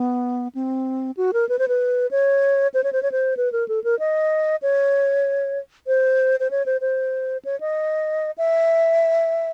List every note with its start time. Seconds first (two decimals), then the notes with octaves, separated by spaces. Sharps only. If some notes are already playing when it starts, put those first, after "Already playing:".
Already playing: B3
0.55 C4
1.17 F#4
1.33 A#4
1.49 B4
1.59 C5
1.68 B4
2.11 C#5
2.74 C5
2.84 C#5
2.93 C5
3.03 C#5
3.12 C5
3.37 B4
3.52 A#4
3.68 A4
3.84 A#4
3.99 D#5
4.62 C#5
5.87 C5
6.40 C5
6.51 C#5
6.66 C5
6.81 C5
7.45 C#5
7.60 D#5
8.38 E5